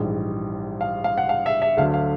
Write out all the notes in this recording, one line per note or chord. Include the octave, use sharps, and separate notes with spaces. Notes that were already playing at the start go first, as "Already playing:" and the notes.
Already playing: A#1 G#2 E3 G3
F5
F5
F#5
F5
E5
E5
D2 D3 F#3 F5
F5